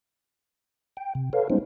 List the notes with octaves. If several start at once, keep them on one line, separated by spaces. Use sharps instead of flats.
G5
C3
A4 B4 C#5 F5
G3 G#3 B3 C#4 D#4 C5